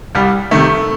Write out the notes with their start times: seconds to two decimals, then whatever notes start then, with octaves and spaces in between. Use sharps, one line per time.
0.15 C2 G3
0.51 C3 D#3 A3